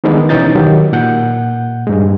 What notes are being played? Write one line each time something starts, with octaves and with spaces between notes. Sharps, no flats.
D#3 E3 G#3 B3 D4 D#4
B2 E3 C#4 D#4 G6 A6
D#3 F#3 G4
A#2 F#5 G6
G2 G#3